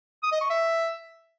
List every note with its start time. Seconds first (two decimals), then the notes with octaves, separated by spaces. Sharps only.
0.23 D#6
0.32 D#5
0.41 C#6
0.50 E5